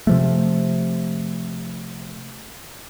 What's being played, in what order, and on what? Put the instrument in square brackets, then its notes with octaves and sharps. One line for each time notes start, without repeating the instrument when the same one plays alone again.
[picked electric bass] C3 F3 A3